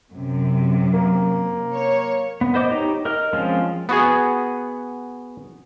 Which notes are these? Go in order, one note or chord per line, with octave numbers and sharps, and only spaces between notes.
F#2 C3
A#3
C#5
B3
B3 C5 D#5 D6
D#4 G4 C#5
A#4 D#5 F6
F3 G#3 C4 C#4 F4
B3 F#4 G#4